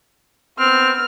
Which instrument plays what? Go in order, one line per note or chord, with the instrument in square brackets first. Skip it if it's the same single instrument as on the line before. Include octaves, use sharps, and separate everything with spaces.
[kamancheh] B3 F6 [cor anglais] C4